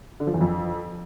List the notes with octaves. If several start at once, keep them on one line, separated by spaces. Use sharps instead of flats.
D3
F3
E2
F2